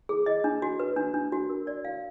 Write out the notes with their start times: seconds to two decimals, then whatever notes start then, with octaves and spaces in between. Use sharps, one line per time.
0.09 G#4
0.26 D#5
0.44 D4
0.62 F#4
0.80 B4
0.96 D4
1.14 D4
1.32 F#4
1.49 A#4
1.67 D5
1.85 F5